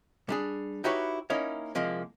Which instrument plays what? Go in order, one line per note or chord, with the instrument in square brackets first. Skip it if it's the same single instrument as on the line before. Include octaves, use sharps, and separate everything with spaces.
[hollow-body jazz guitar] G3 D4 G#4
D#4 E4 F#4 G4 B4 C#5
A#3 C#4 D#4 E4 C#5
C2 F3 G#3 A#3